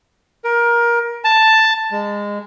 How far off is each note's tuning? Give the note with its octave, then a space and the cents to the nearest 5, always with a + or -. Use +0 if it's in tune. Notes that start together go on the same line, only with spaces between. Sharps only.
A#4 +20
A5 +5
G#3 -20